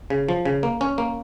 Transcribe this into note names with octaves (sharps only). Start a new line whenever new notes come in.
C#3
F3
C#3
A#3
C#4
A#3